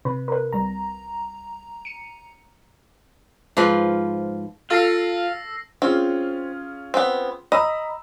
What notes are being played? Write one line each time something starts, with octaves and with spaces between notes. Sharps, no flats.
C3 B4
A#4 B4
C2 G3 A#5
C#7 D#7
G#2 F3 F4 B4
F4 A4 F5 E6 A#6 C7
C4 C#4 F4 G#4
B3 C4
D#5 A#5 B5 E6